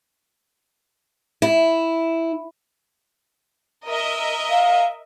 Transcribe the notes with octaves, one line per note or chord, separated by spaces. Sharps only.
E4
A#4 D#5 E5
F5